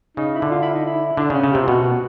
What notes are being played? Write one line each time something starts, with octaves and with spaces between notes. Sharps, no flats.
C#3 D#4
E4
D3
F4
E4
D#4
E4
D3 D4
C#3 C#4
C#3
C3 G4
F4
B2 F#4